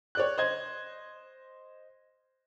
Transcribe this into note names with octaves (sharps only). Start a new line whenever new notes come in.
C#5 D5 F#6
C5 D#5 G#6